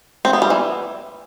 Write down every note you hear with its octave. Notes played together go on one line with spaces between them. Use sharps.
C4
B3
G3
E3